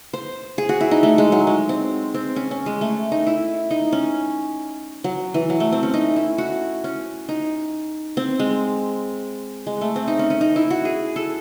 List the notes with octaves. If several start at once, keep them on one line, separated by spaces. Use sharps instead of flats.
C5
G#4
F#4
E4
D#4
A3
G#3
F#3
G#3
C4
C4
C#4
C#4
G#3
A3
D#4
E4
D#4
C#4
F#3
E3
F#3
A3
C4
C#4
D#4
E4
F#4
C#4
D#4
C4
G#3
G#3
A3
C4
D#4
C#4
C#4
D#4
E4
F#4
G#4
A4